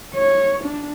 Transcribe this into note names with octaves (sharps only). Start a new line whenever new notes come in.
C#5
D4